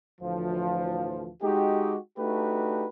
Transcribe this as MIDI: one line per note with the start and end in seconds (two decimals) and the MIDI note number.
0.21 1.28 38
0.21 1.28 45
0.21 1.28 52
0.21 1.28 53
1.42 1.96 56
1.42 1.96 63
1.42 1.96 66
1.42 1.96 67
2.18 2.86 57
2.18 2.86 62
2.18 2.86 63
2.18 2.86 66
2.18 2.86 67
2.18 2.86 71